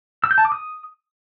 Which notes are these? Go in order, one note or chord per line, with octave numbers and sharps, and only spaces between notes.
E6
G6
A5
D6
D#6